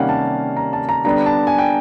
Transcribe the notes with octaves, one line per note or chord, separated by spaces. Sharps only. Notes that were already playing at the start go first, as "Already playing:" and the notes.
Already playing: C3 D#3 G3 A#3 C#4 F5 F#5
A5
A#5
A5
A#5
D3 G3 B3 D4 A#5
A5
G#5
G5